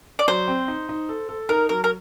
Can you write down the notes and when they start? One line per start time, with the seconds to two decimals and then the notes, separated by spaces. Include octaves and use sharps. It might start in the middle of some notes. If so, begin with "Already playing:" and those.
0.19 D5
0.28 F#3 C5
0.48 C4
0.68 D#4
0.89 D#4
1.09 A4
1.29 A4
1.49 D#4 A#4
1.69 F#3 A#4
1.84 A#4